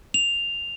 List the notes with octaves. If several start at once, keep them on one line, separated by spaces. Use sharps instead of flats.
F7